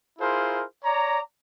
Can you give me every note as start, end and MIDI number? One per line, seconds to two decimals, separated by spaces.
0.20 0.63 64
0.20 0.63 65
0.20 0.63 68
0.20 0.63 70
0.20 0.63 72
0.84 1.19 73
0.84 1.19 74
0.84 1.19 82